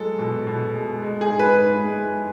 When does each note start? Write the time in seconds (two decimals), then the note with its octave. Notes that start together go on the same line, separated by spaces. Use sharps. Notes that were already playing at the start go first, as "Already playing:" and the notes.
Already playing: F#3 G#3 A4
0.19 B2
0.47 B2
0.74 G#3
1.02 G#3
1.21 G#4
1.30 G#2
1.39 B4
1.58 G#2
1.85 G#3